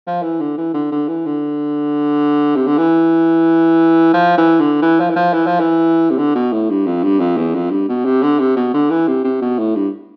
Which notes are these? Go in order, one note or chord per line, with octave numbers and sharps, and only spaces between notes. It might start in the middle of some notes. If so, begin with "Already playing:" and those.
F3
E3
D3
E3
D3
D3
E3
D3
C3
D3
E3
F3
E3
D3
E3
F3
E3
F3
E3
F3
E3
C3
D3
B2
A2
G2
F2
G2
F2
E2
F2
G2
B2
C3
D3
C3
B2
D3
E3
C3
C3
B2
A2
G2